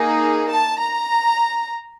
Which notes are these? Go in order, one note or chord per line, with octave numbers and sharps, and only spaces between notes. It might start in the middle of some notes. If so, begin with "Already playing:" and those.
Already playing: A#3 D#4 G#4
A5
A#5